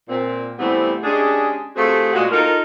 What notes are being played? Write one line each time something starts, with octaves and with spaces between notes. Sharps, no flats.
A#2 C4
C3 E3 G3 A3 B3 C4
G#3 C#4 D4 G4 G#4
C3 A3 C4 F4 F#4 G#4
A#2 G#3 F4 F#4
D#4 F4 A4 A#4